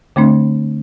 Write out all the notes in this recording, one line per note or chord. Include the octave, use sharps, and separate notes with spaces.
D3 A3 C4 D4